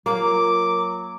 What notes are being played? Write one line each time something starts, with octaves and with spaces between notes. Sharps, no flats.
F#3 A#3 F4 A#4 D6